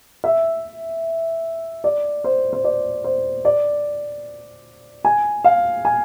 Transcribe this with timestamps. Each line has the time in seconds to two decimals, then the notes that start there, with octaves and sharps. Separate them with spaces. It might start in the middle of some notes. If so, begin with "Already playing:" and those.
0.24 E5
1.84 D5
2.24 C5
2.53 C5
2.64 D5
3.04 C5
3.45 D5
5.05 G#5
5.44 F5
5.85 G#5